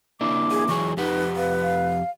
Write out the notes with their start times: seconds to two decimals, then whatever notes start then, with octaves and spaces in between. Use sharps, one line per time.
0.21 A#3 D4 E4 D6
0.51 G#4
0.68 E3 F#3 G#4 C#6
0.97 F2 D#4 G4 B4 F#5
1.36 B4 F5
1.62 F5